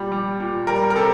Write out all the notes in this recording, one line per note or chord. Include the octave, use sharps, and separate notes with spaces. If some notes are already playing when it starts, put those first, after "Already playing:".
Already playing: A#2 G3
G3
A#2
G3 A#4
A#4
C3 A4